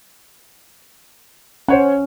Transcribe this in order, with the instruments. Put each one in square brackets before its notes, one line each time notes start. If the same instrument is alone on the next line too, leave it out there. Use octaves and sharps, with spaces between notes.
[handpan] C#4 [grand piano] C5 C#5 F#5